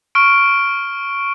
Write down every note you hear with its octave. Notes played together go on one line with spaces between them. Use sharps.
C#6 F6 D7